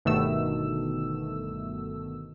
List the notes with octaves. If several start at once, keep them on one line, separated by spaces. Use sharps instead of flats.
G1 B2 D#3 A3 E6